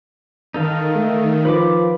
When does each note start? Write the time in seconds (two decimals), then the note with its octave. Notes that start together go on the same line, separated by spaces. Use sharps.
0.54 D#3 D#4 A4 F5
0.95 A3
1.45 F3 B4 B5 D6